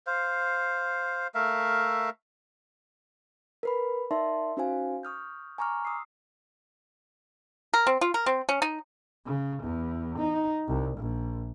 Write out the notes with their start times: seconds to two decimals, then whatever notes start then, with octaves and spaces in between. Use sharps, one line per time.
0.07 C5 F5
1.34 A3 A#4 E5 F5
3.63 A#4 B4 B5
4.11 D#4 A#4 D5 E5 A5 C6
4.57 C#4 D#4 F#4 C5 F5 G#5
5.03 C#6 D#6 F6 G6
5.58 G#5 A#5 C#6 D6 F6
5.85 D#6 E6 C7
7.74 A#4
7.87 C4
8.01 F4
8.14 A#4
8.26 C4
8.49 C#4
8.62 D#4
9.26 C#3
9.62 E2
10.18 D#4
10.68 C2
10.97 A#1